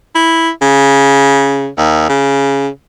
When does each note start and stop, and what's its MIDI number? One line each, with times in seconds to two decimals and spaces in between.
0.15 0.49 64
0.62 1.68 49
1.78 2.06 39
2.09 2.68 49